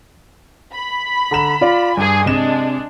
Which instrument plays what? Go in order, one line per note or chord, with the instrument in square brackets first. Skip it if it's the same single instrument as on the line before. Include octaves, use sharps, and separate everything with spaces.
[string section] B5
[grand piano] D3 A#5 E7
F4 D5 F5
[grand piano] G2 [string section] G#4 G#5
[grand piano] C3 E7 [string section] G#3 D4